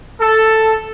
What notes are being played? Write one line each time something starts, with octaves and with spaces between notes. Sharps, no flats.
A4